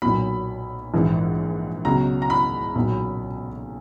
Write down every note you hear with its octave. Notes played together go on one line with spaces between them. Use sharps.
B1 A#2 F#3 B5
A#1 G#2 E3
C#2 B2 F#3 A#5
A#5
B5
B1 A#2 F#3